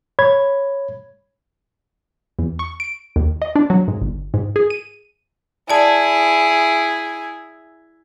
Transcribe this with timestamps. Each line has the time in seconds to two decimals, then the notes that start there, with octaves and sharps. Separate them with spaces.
0.19 C#5 B5 G#6
2.39 E2
2.59 C#6
2.80 D7
3.16 D#2
3.42 D#5
3.56 D4
3.70 F#3
3.88 G#2
4.02 G1
4.34 G#2
4.56 G#4
4.70 D#7
5.70 E4 G#4 D5 A5